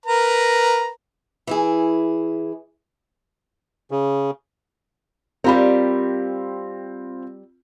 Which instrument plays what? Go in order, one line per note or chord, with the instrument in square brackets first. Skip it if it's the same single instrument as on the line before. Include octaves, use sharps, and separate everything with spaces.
[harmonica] A#4 B4 A#5
[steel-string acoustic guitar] E3 E4 G#4
[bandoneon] C#3
[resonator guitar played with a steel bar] G3 G4 A#4 [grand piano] C4 F4 B5